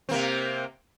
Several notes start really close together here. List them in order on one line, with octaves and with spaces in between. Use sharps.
C4 A#3 C3